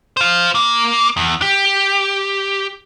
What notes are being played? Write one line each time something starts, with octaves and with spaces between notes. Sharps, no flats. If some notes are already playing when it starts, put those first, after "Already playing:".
C5 F5
A#3
E2
G4